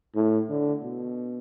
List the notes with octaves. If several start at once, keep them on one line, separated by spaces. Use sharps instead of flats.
A2
D3
B2